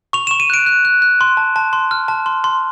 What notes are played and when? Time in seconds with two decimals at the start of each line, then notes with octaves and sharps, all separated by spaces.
0.13 C#6 F7
0.27 C#6 E7
0.40 D#7
0.50 F#6 D7
0.66 F#6
0.85 F#6
1.02 F#6
1.21 C6
1.37 A5
1.56 A5
1.73 C6
1.91 F6
2.08 A5
2.26 C6
2.44 C6